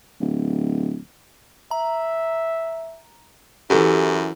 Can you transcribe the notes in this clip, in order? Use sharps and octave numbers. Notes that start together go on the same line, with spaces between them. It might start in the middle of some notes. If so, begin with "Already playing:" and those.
D1
E5 A#5
F#2 E3 E4 G4 A4